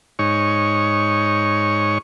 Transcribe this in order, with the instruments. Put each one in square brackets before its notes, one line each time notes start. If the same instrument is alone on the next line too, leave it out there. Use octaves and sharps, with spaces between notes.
[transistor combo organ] G#2 D#4 C#5 C#6